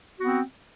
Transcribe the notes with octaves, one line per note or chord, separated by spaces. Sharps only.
B3 C4 F#4